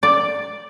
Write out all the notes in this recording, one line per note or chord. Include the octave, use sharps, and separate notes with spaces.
D5